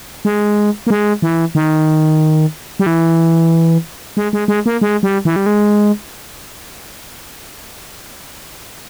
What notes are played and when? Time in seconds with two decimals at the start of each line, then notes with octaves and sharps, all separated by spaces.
0.25 G#3
0.87 A#3
0.90 G#3
1.22 E3
1.55 D#3
2.80 G3
2.86 E3
4.17 G#3
4.33 G#3
4.48 G#3
4.66 A#3
4.81 G#3
5.03 G3
5.25 E3
5.36 G3
5.46 G#3